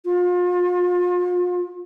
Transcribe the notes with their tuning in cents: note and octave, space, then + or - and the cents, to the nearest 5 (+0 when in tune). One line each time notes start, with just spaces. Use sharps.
F4 +35